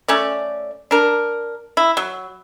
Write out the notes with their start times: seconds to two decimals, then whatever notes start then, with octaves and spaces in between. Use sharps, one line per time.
0.08 A3 C#4 D5
0.91 D4 A#4
1.77 E4
1.97 F#3